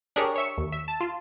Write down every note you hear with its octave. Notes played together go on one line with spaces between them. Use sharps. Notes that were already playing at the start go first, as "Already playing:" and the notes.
D4 G4 G#4 A#4 C#5
C#5 E5 C#6
D#2
E5
A5
F4